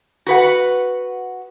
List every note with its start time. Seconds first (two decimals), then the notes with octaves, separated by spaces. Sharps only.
0.27 F#4 B4 F#5